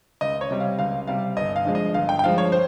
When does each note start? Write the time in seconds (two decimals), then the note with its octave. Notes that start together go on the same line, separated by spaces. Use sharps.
0.21 C#2 D#5
0.41 C#5
0.51 C3 G3
0.60 F5
0.79 C#2 F5
1.07 C3 G3 F5
1.37 G1 D#5
1.56 F5
1.65 G2 F3 G#3
1.75 D#5
1.94 G1 F5
2.09 G5
2.19 G5
2.24 G2 F3 G#3 F5
2.38 C#5
2.52 C5